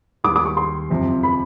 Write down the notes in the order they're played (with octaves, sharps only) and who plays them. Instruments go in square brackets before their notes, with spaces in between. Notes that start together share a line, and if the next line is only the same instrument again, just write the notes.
[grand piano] D#2 D#3 G3 [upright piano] D6
[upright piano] D6
C#6
C6
[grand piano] F#1 F2 C3 F3
[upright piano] B5